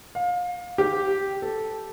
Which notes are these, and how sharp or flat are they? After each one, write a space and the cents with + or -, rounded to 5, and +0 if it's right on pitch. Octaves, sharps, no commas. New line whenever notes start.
F5 +30
G4 -5
A4 -5